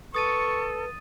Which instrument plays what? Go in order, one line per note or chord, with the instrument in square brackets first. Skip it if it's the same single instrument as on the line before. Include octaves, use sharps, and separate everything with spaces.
[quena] A4 [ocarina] B4 [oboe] C#6 [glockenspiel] D#6 A6 D#7